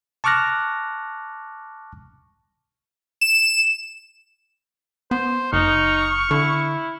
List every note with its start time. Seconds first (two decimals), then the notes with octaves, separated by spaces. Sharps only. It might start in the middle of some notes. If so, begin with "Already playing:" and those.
0.24 A5 C#6 D6 F6 F#6 A#6
3.21 E7
5.11 B3 C5
5.53 F#1 D#4 C#6 F6
6.31 D3 E4